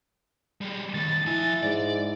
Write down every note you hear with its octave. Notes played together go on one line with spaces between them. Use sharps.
G3 G#3
D#3 A3 A6
F3 E4 G#5
G#2 D5